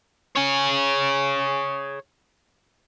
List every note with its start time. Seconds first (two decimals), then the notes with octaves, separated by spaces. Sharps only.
0.36 G#4 C#5